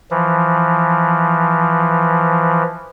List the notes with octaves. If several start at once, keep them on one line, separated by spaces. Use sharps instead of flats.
E3 F3